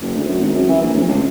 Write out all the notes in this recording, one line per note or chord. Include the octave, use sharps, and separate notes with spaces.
F#1
D2
F#2
G#1
F#2
E3
A#1
D1
C#2